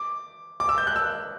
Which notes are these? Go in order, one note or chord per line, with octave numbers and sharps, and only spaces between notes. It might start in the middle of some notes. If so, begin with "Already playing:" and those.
Already playing: D6
D6
E6
G6
F#6
E6